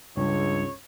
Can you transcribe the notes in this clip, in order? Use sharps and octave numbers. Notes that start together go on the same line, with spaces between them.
C#2 G2 C#3 C#5